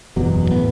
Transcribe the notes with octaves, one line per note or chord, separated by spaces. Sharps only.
F#1 E2 B2 F#3
A2 B3